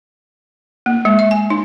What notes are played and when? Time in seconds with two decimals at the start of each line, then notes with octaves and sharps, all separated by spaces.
0.86 A#3
1.05 G#3
1.19 E5
1.31 G#5
1.50 D#4